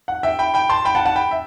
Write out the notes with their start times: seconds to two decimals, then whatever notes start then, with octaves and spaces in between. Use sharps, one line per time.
0.08 F#5
0.23 E5 G5
0.39 G5 B5
0.54 G5 B5
0.69 A5 C6
0.85 G5 B5
0.95 F#5 A5
1.05 F#5 A5
1.16 G5 B5
1.31 E5